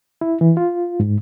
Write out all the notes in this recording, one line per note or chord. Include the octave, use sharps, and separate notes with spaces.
E4
E3
F4
G#2